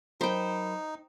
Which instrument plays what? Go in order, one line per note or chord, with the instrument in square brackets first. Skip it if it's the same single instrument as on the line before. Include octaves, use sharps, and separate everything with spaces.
[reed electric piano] F#3 A#4 B5 [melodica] D#4 [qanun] C5 G5